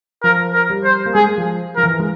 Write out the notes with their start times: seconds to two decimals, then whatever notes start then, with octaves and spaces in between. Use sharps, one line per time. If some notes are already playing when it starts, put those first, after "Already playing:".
0.23 F3 A#4
0.53 A#4
0.70 G3
0.84 C5
1.06 A#3
1.14 G#3 G#4
1.38 F3
1.76 F3 A#4
1.83 E3
1.99 G#3